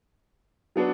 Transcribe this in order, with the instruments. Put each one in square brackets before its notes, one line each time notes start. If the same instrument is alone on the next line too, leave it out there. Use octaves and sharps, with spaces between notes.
[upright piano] F#3 B3 D4